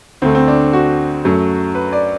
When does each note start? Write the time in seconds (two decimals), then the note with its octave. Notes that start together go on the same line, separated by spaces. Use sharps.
0.22 D2 D3 A3 C4
0.35 C4
0.48 D4
0.73 F#4
1.25 F#2 F#3 A3
1.75 B4
1.93 D5